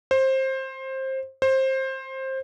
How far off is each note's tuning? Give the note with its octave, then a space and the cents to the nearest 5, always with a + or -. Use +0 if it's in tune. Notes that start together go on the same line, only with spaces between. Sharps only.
C5 +20
C5 +20